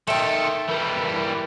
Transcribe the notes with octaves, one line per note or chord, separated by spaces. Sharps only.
D#3 A3 A4 G5 C6
E3 G3 A#4